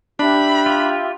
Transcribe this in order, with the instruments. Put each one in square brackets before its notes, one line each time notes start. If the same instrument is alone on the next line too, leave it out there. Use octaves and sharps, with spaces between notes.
[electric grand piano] D4 [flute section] G4 E5 [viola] B5
[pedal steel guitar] F4